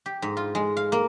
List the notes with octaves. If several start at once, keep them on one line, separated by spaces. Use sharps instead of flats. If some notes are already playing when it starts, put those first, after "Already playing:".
G4
G#2
F4
G#3
F5
A#3